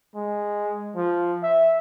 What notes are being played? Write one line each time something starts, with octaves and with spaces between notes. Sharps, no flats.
G#3
F3
E5